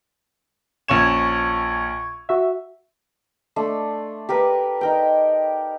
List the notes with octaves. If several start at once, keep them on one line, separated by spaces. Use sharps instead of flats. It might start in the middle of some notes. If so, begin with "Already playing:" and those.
A#1 C#4 C#6 G#6 E7
F#4 E5
A3 D4 C6
G4 A#4 B4
D#4 A#4 G5